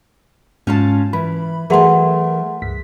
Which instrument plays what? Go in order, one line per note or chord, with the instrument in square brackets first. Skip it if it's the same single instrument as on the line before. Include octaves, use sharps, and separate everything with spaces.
[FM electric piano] G#2 [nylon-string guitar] C#4 F4 A5
[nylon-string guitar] E3 [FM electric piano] B5
[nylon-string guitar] E3 A3 [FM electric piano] F#3 A#4 E5 [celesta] G#4 F#5 C6
[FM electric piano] C#2 G2 B6